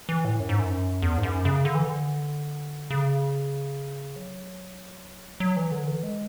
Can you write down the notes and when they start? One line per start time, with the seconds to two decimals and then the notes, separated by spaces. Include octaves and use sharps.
0.09 E3
0.25 A2
0.40 F#2
0.49 G#2
0.59 F#2
1.02 E2
1.18 G#2
1.23 F#2
1.45 C#3
1.65 D3
1.75 E3
1.85 D3
2.90 C#3
4.16 F#3
5.40 F#3
5.57 E3
5.72 D3
5.87 E3
6.03 G#3